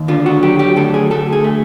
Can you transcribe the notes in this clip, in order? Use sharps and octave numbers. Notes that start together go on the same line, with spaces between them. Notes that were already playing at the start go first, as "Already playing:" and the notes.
Already playing: D#2
D3 F4
F#4
F#3 G4
G4
D2 A4
G#4
D2 A4
G#4
A3